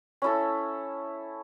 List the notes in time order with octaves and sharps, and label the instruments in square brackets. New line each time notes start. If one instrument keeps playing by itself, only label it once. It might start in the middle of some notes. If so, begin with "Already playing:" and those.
[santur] C#4 E4 A4